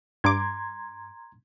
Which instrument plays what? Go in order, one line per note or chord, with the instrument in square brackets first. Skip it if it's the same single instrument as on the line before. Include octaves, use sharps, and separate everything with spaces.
[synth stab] G2 D6 [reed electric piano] A#5 C6 G#6